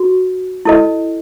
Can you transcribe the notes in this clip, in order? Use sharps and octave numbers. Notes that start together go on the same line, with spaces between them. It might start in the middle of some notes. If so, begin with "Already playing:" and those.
Already playing: F#4
E4 A4 D#5